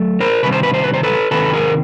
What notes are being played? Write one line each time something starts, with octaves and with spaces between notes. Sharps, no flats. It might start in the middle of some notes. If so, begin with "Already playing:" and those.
Already playing: F#3 A3
A#4 C5
C3 D#3 G3 C4 B4
C5
B4
C5
B4
C5
A4 B4
C3 D#3 C4 A4 B4
G#4 A#4